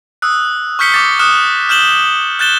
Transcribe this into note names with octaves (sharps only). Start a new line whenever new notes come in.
D#6 E6 F#6
C#6 F6 G6 B6 C#7 G7
D6 A6 C#7
D#6 F6 F#6 E7
F6 G6 E7 F#7 G7
F#6 G6 A6 E7 G7